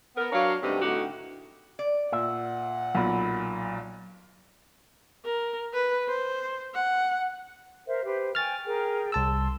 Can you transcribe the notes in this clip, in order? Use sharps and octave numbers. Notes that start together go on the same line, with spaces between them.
B3 A#4
F#3 D4 A#4 C#5 F5
G2 C3 A3 B3 D#4 G4
A2 D3 D#4 F#4 G4
D5
A#2 E5 F#5
B1 A#2 F#3 B5
A#4
B4
C5
F#5
A#4 C5 E5
G4 B4 C5
G5 G#5 C#6 F6 A6
G#4 A#4 G5
C2 A5 C6 E6